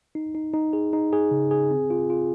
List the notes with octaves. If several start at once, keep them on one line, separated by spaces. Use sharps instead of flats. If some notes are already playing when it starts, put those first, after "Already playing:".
D#4
D#4
D#4
G#4
D#4
G#4
C#3
G#4
C4
F4
F4